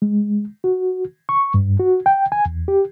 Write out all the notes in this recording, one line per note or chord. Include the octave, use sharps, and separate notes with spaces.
G#3
F#4
C#6
G2
F#4
G5
G#5
E2
G4